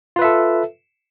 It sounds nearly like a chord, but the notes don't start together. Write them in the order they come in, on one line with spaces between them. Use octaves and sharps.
F4 B4 E5 A4